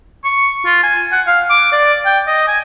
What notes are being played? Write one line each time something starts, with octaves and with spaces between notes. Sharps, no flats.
C#6
F4
G#5
F#5
F5
D6
D5
G5
D#5
G#5